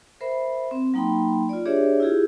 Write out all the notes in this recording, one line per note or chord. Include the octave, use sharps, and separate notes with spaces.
A#4 C5 E5 B5
C4
F#3 A#3 D#4 G5 B5 C6
F4 D5
D4 G4 G#4 C#5 D5 E5
E4 F4 G4 G#4